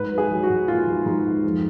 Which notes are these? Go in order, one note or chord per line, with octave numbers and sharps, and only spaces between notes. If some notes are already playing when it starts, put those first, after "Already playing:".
Already playing: G#2 B4
F#3
G#4
F#3
F#4
G#2
A#3 F4
G#2
G#2
G#2
F2